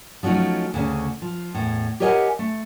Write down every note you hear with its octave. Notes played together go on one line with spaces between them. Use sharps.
F3 F#3 A3 C#4 D#4
D2 C#3 C#4
F3
E2 A2
G4 A#4 C#5 D#5 F#5 G#5
A3